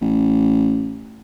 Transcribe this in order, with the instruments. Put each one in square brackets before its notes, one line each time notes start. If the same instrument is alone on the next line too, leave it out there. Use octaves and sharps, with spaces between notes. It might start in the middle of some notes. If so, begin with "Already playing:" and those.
[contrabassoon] A1